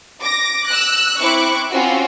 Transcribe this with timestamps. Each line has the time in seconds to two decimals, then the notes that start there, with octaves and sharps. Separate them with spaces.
0.21 D6 A#6
0.68 E6 F#6
1.20 C4 E4 C#6 D6 F#6
1.71 C4 C#4 F4 F#4